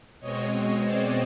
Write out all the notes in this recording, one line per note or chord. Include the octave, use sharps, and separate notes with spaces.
B2 G#3 C4 C#5 D#5
C5 D5